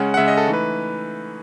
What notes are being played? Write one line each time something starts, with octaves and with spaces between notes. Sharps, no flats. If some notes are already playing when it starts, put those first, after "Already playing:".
Already playing: C#3 G#3 C#4 F#5
F#5
C#3 G#3 C#4 E5
D#5
A4
E3 A3 D#4
B4